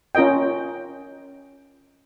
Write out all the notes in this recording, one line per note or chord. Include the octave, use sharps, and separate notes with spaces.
C#4 F4 A#4 D#5 G5